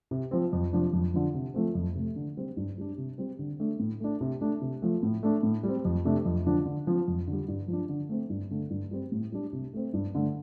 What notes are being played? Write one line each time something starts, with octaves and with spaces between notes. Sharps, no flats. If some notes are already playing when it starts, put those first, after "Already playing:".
C3
F3 C4
F2
C3 F3 D4
F2
D3 F3
C3
F3 A3 C4
F2
C3 A3
D3
G3 C4
G2
G3 D4
C3
G3 C4
D3
A3 D4
A2
A3 D4
C3
A3 D4
C3
F3 A3
A2
A3 D4
A2
G3 C4
F2
C3 A3 D4
F2
D3 F3 D4
D3
F3 C4
F2
D3 G3
G2
F3 D4
D3
A3 C4
G2
D3 A3
G2
G3 C4
A2
G3 D4
C3
A3 C4
G2
D3 A3